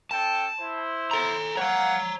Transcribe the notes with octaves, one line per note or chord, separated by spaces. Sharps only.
C#4 A4 G5 A5
E4 C5
A4 A#5
A#3 C#5 F5 F#5 A#5